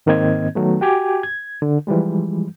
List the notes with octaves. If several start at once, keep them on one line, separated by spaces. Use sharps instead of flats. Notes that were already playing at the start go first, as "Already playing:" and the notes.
G#2 D#3 A#3 C4 D#5 G#6
D#3 F#3 A3 B3
F#4 G4 G5 G#5 D6 G#6
G#6
D3
E3 F3 G3 G#3